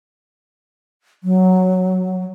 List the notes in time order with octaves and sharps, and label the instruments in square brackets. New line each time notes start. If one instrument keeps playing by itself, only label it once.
[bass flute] F#3